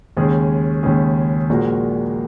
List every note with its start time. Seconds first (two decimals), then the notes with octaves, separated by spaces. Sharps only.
0.17 D#2 C#3 G#3 C#4 G#4
0.83 D#2 C#3 G#3 C#4 G#4
1.50 A#1 A#2 G#3 F#4 A#4